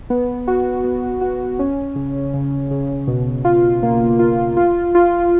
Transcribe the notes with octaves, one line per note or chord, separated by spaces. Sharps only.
B3
F#4
B3
F#4
C#4
C#3
C#3
C#3
B2
F4
A#3
F4
F4
F4